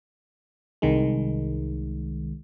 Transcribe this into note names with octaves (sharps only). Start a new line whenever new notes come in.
C2 D#3 G#3